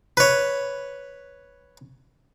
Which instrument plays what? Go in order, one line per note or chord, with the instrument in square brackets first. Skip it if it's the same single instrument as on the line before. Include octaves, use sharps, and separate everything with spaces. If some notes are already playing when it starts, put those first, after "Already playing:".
[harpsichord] B4 C#5